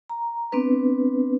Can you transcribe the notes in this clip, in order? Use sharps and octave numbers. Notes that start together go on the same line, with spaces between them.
A#5
B3 C4 D4 B4